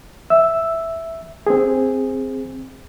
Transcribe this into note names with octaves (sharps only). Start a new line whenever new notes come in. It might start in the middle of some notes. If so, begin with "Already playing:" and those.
E5 E6
C4 G#4